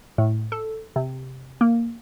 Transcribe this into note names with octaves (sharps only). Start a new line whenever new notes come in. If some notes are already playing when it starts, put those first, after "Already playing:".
A2
A4
C3
A#3